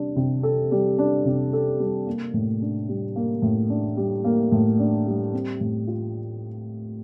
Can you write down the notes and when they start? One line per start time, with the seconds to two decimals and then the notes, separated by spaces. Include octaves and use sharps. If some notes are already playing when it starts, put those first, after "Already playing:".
Already playing: C3 G3 D4
0.16 C3
0.43 A4
0.71 G3
0.99 D4
1.25 C3
1.53 A4
1.80 G3
2.06 A#3
2.34 A2
2.62 D4
2.89 G3
3.16 A#3
3.42 A2
3.70 D4
3.97 G3
4.24 A#3
4.52 A2
4.79 D4
5.06 G3
5.33 C4
5.61 A2
5.87 F4